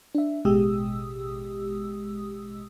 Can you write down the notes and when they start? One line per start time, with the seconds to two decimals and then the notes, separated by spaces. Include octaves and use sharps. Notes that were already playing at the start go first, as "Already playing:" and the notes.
0.15 D4 E5
0.45 A1 B2 G#3 G4 D#6 E6